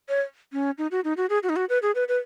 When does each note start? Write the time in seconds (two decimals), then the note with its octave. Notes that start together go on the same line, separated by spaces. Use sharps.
0.09 C#5
0.53 C#4
0.78 D#4
0.91 F#4
1.04 D#4
1.17 F#4
1.30 G#4
1.43 F#4
1.49 D#4
1.56 F#4
1.69 B4
1.82 G#4
1.95 B4
2.08 B4